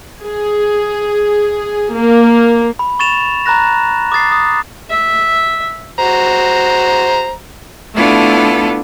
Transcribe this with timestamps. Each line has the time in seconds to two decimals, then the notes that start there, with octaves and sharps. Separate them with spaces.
0.21 G#4
1.93 A#3
2.79 B5
2.99 C#6 A6 E7 F7
3.46 A#5 B5 F#6 A#6
4.12 D6 D#6 A6 C7
4.32 D#6
4.90 E5
5.99 F#4 C5 A#5
7.94 A3 B3 D4 E4 F4 A4